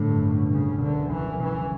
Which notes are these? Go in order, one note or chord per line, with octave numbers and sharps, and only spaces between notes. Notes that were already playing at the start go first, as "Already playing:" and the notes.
Already playing: A2 D3 G3
G2
C#2
B2
C#3 G3
C#2
F#1 D3
E2
C#3 E3
F#1
E3 C#4